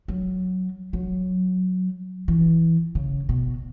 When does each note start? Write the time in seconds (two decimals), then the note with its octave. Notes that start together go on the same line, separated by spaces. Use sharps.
0.08 F#3
0.93 F#3
2.28 E3
2.95 C#3
3.29 B2